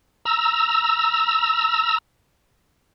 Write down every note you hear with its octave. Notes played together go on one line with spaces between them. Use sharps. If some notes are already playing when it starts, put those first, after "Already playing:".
A#5 E6